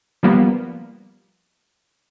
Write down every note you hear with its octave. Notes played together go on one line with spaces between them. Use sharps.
F3 G3 A#3 B3